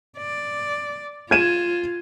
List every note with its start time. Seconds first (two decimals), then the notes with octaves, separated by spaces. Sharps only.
0.18 D5
1.31 F4 G#6 D#7 E7